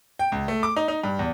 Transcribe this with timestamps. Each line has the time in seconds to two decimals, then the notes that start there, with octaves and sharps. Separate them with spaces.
0.19 G5
0.32 C#2
0.48 A3
0.63 D6
0.76 D#4
0.88 D#4
1.04 G2
1.19 E2